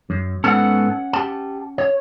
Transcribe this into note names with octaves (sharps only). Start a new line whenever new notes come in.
F#2
G#2 B3 C#4 A4 F#5
G4 A5
C#5